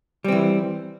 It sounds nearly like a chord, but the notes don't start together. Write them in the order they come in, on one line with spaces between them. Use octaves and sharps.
G3 C4 E3